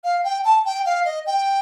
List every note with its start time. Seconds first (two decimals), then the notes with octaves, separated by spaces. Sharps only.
0.04 F5
0.24 G5
0.45 A5
0.65 G5
0.86 F5
1.05 D#5
1.26 G5